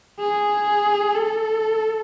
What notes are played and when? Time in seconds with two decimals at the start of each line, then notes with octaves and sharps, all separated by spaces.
0.20 G#4
1.15 A4